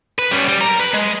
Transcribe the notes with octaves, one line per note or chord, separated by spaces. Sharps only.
B4
G3 C#4
G3
A#4 A#5
B4
G#3